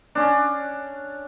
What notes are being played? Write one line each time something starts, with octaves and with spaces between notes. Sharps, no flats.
C#4 D4